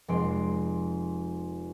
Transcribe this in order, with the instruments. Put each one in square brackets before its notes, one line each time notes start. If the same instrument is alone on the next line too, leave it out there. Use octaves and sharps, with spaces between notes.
[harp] F1 G#3 C6 D7